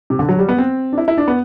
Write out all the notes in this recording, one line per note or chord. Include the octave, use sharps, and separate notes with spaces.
C3
D3
F#3
G3
B3
C4
D4
E4
E4
D4
B3